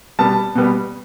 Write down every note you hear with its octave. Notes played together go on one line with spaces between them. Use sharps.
B2 G3 B3 A5
B2 G3 B3